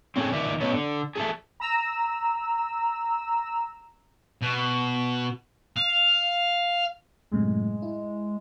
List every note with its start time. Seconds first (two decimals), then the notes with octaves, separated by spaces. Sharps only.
0.16 C4 C#4 G#4 A4
0.32 D#3 D5 E5
0.61 F#3 B3 C#4 B4 C#5 D#5
0.73 D3
1.16 G#4 A4 E5
1.60 A#5 E6
4.41 B2
5.77 F5
7.32 F#2 A2 C3 G#3
7.82 E4